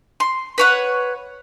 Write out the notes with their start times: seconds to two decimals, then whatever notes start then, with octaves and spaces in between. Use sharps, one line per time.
0.20 C6
0.58 B4 C#5 F#5